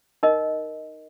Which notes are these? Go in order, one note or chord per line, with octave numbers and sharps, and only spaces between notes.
D#4 A#4 D#5